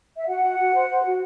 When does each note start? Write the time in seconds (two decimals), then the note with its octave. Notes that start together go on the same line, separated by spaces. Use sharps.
0.17 E5
0.29 F#4 F#5
0.43 F#4
0.58 F#4
0.74 C5
0.89 C5
1.04 F#4